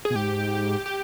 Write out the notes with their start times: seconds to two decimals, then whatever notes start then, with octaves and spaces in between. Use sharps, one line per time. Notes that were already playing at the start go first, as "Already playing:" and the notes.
0.05 G#4
0.10 B2
0.15 G#2 G4
0.86 G4